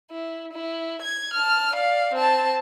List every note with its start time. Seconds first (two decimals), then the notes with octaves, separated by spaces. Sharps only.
0.11 E4
0.53 E4
1.02 G#6
1.34 A5 F6
1.73 D5 F5
2.13 C4 A5